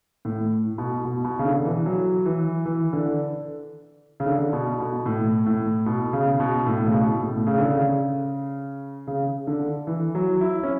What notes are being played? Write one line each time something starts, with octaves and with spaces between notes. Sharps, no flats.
A2
B2
B2
B2
C#3
D3
E3
F#3
E3
E3
D3
C#3
D3
B2
B2
A2
A2
B2
C#3
B2
A2
C#3
B2
A2
C#3
D3
C#3
C#3
D3
E3
F#3
E4
C#4